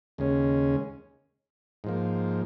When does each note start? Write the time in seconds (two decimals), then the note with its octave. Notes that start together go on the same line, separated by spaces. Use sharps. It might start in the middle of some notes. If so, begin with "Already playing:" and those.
0.18 D#2 C#3 G#3 C#4
1.84 G#2 F3 A#3